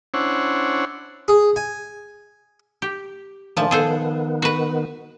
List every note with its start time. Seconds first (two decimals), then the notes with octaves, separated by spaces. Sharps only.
0.14 C#4 D4 E4 C5 C#5 F#5
1.28 G#4
1.56 G#5
2.82 G4
3.57 A#2 D#3 F3 A3 D4 A5
3.71 D#3 B3 G#4 A4 C5
4.42 F#4 B4